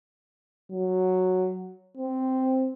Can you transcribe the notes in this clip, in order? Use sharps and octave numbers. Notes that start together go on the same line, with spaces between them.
F#3
C4